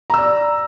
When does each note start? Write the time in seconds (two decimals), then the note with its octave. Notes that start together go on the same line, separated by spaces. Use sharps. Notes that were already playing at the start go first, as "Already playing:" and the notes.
0.10 A#5
0.14 E6
0.18 D5